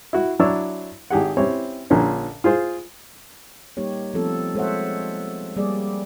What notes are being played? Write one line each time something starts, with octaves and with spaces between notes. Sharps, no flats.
E4 F#4
F#3 D4 E4 C#5 D5 E6
G#1 G4 G#4 F#5
C4 C#4 E4 G4 C#5
A#1 A#2 D3 C#4
F4 G#4 C5
G3 A#3 D#4 G4 C#5
F3 A3 B3 C4 F4 A4
G#3 A4 C5 C#5 E5 F#5
G3 A#3 G#4 D5